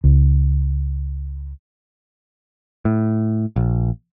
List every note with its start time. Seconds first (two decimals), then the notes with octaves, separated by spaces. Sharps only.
0.04 C#2
2.85 A2
3.56 A#1